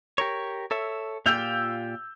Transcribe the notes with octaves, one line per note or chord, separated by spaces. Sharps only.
G4 A#4 C#5
A4 C#5 E5
A#2 F4 G4 E6 G6 F7